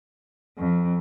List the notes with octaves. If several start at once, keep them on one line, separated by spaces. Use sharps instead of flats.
F2